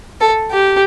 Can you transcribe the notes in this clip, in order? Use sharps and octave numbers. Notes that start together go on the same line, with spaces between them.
A4
G4